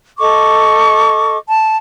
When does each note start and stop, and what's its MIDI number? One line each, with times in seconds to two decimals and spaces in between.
0.18 1.37 69
0.18 1.37 75
0.18 1.37 85
0.18 1.37 86
1.48 1.77 81